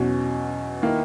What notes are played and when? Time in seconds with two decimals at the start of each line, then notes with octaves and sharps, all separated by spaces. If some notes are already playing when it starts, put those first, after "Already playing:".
Already playing: E2 B2 F#3 C#4
0.82 D#3 A#3 E4